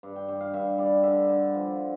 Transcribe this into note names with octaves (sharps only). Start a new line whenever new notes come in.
G2
G5
G2 G5
F5
G2 E5
G3 D5
D3 E5
D3
F3